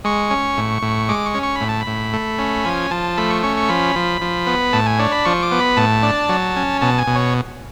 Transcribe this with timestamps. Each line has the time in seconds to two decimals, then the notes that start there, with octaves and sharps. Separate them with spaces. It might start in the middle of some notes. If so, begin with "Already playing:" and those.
0.04 G#3 C#6
0.30 C#4
0.58 A2
0.82 A2
1.09 G#3 D6
1.26 C#6
1.34 C#4
1.43 C#6
1.55 B5
1.61 A2
1.69 A5
1.81 B5
1.87 A2
2.13 A3
2.38 C#4
2.65 F3 G#5
2.91 F3 A5
3.17 A3 B5
3.30 C#6
3.43 C#4 C#6
3.57 C#6
3.69 F3 B5
3.96 F3
4.21 F3
4.47 B3
4.73 A2 A5
4.86 G#5
4.99 D4 C#5
5.12 B5
5.25 F3 C#6
5.43 D6
5.52 B3
5.60 B5
5.77 A2 A5
6.03 D4
6.29 F#3
6.56 C#4
6.81 B2 A5
6.98 G#5
7.07 B2
7.16 C#5